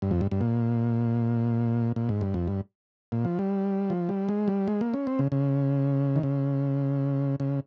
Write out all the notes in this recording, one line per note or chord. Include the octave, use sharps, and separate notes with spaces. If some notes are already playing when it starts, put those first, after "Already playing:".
G2
F2
G2
G2
A#2
A#2
G#2
G2
F2
G2
A#2
F3
G3
F3
G3
G#3
G3
G#3
A#3
C#4
C4
C#3
C#3
D#3
C#3
C#3